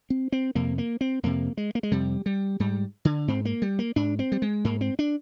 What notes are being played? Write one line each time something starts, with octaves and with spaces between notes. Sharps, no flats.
C4
C4
F2 C3 A#3
A#3
C4
F2 C3 A#3
G#3
A#3
G#3
F2 C3 G3
G3
G#2 G3
D3
G#2 C4
A#3
G3
A#3
G#2 D4
C4
G3
G#3
G#2 A#3
C4
D4